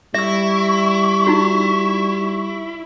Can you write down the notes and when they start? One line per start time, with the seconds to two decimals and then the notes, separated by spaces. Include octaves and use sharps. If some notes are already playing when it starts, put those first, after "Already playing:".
0.14 G3 E4 E5 C#6 E6
1.27 D#4 F4 F#4